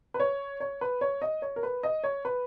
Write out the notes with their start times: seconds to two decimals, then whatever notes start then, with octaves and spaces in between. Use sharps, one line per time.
0.14 B4
0.20 C#5
0.60 C#5
0.81 B4
1.01 C#5
1.22 D#5
1.42 C#5
1.56 A#4
1.63 B4
1.83 D#5
2.04 C#5
2.25 B4